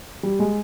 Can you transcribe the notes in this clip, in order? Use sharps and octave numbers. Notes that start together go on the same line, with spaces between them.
G3
G#3